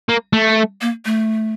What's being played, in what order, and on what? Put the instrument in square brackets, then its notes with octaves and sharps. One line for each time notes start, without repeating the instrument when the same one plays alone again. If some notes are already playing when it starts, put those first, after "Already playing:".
[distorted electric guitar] A#3
A3
[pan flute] A#3
A3